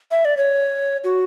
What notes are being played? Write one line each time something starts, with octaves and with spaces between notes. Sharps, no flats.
E5
D5
C#5
F#4